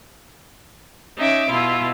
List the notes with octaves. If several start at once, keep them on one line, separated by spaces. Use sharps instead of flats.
C#4 D#4 E5 D6
B2 E4 F4